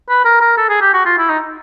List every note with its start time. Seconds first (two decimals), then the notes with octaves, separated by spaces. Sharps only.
0.09 B4
0.25 A#4
0.41 A#4
0.57 A4
0.69 G#4
0.81 G4
0.94 F#4
1.05 F4
1.18 E4
1.30 D#4